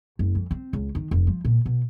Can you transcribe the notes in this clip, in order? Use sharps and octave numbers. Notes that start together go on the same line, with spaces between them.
F#1
F2
C4
C#2
D#3
F1
F3
A#2
B2